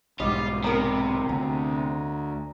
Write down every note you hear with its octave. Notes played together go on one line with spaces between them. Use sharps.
B1 G#2 G3 F4 D#5
C3 B3 A#4 A#5
D2 A#5